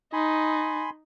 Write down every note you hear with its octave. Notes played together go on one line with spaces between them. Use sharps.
D#4 G#5 B5 C6